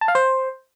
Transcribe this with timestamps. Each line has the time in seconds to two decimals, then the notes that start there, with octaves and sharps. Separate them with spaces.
0.01 A5
0.08 F5
0.15 C5